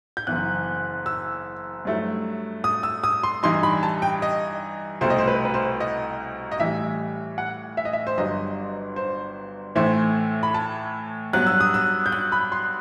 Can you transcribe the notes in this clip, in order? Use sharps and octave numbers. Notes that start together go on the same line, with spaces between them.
G6
F#1 F#2 E3 B3 F#6
E6
G2 F#3 A3 E4
D#6
E6
D#6
C6
G2 E3 G3 D#4 C6
B5
A5
G5
D#5
C2 B2 A3 C5
D#5
C5
B4
B4
C5
D#5
D#5
A2 E3 G3 E5
F#5
E5
D#5
E5
C5
G1 G2 F#3 D#5
C5
A2 E3 A3 E4 C5
B5
A5
G2 F#3 B3 F#6
E6
D#6
E6
G6
F#6
B5
C6